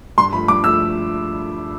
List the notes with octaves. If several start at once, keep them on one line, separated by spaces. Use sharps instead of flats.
G2 C6
F3 A3 B5
G2 D6
F3 A3 E6